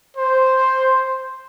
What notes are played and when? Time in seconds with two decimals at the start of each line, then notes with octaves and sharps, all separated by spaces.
0.17 C5